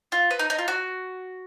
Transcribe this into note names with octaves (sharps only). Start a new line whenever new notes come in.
F4
B4
D#4
D#4
F4
F#4